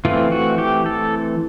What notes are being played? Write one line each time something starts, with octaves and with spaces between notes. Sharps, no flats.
E3 A3 C4 F4
F#4
G4
A4